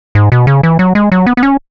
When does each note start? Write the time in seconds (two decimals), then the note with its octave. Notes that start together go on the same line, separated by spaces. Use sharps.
0.15 G#2
0.32 B2
0.47 C#3
0.63 E3
0.79 F#3
0.95 G#3
1.12 F#3
1.26 B3
1.37 B3
1.43 C#4